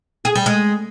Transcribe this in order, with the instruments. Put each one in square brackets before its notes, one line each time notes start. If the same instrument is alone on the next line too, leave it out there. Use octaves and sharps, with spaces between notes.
[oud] G#4
G3
G#3